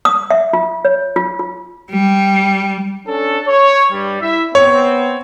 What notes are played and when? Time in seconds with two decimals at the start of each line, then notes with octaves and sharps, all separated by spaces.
0.05 D#6
0.31 E5
0.53 F4
0.85 C#5
1.16 F4
1.39 F4
1.91 G3
3.07 C#4 D4 A4
3.47 C#5
3.92 G2 G3
4.21 E4 E5
4.55 B3 C4 C#5